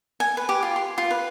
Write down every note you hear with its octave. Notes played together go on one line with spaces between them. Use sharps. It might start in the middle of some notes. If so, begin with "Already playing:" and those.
G#5
B4
G4
F4
C6
F4
B4